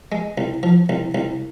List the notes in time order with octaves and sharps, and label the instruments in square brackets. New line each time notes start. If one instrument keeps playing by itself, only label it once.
[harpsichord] G#3
C2
F3
C2
C2